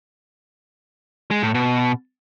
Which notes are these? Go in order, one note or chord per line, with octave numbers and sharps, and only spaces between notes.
G#3
A2
B2